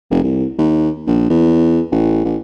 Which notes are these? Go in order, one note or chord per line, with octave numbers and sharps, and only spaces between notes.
F1
C2
D#2
A#1
E2
A1
A1